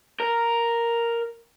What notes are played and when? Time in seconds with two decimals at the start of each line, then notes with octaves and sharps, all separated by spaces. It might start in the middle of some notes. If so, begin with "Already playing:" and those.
0.20 A#4